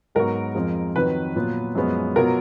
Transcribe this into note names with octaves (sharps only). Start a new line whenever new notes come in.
G#2 F#3 B3 F#4 A#4
F2 F3 G#3
F2 D#3 F#3 B4
A#2 F#3 B3 F4
F#2 F3 G#3 B3
B2 F#3 B3 F4 A#4